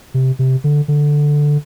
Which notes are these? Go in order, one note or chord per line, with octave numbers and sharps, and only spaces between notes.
C3
C3
D3
D3